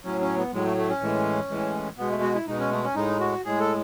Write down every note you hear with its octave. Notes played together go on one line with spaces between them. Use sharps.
A2 F#3 C#4
C#4
B3
A2 F#3 G#3
A3
A3
C#4
A2 E3 G#3
A2 E3 G#3
B2 G#3 B3
A3
F#4
E4
B2 G#3 D#4
C#4
A3
C#4
A2 G#3 D#4
F#4
A2 G#3 G#4
A4